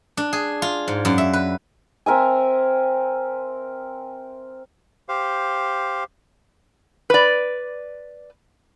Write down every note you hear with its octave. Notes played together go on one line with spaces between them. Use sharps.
D4
G#4
F4
G#2
F#2
E5
B4
C4 A#4 E5 G#5
G4 C5 F5
B4 D5